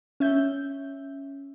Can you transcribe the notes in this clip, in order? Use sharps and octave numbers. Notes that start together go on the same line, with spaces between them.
C#4 E5 G6